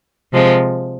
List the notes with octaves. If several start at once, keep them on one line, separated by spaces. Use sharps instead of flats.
C3 F3 G#3